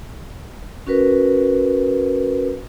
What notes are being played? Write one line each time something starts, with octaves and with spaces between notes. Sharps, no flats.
C#4 F#4 A#4 B4